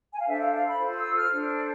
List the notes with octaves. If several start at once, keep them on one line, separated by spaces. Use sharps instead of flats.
G#5
F5
D4 A4 C5 E5
F5
F5
B5
F4 A4 C5
E6
F6
D4 A4 C5